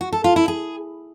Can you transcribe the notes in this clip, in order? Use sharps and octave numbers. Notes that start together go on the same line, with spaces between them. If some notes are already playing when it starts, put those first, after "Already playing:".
F#4
A4
F4
E4
G#4